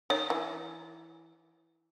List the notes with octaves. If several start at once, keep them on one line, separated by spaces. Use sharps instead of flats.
D#3 C#5
E3